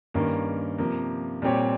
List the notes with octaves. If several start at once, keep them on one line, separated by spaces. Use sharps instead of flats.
G2 D#3 A#3 C#4
C3 F3 A#3
A#2 G3 C4 G4 C#5